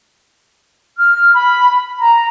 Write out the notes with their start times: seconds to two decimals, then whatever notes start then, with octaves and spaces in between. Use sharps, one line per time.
0.98 F6
1.34 B5
1.99 A#5